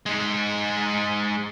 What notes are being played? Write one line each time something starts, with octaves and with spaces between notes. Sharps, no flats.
G#3 D#4